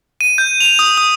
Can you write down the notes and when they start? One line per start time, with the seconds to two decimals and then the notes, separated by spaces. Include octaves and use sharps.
0.21 D#7
0.38 G6
0.60 F7
0.79 D#6
0.98 D#6